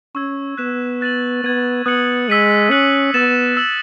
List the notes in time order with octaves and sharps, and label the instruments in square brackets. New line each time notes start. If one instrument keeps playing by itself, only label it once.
[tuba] C#4 [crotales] C#6 E6 G#6
[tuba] B3 [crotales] F#6 B6 E7
[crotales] F#6 A6 D#7 F#7
[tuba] B3 [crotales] G#6 D#7 F#7
[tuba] B3 [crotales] D#6 F#6 C#7 F#7
[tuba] G#3 [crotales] E6 B6 D#7 F#7
[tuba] C#4 [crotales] F#6 C#7 F#7
[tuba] B3 [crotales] E6 A6 E7
[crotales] E6 B6 F#7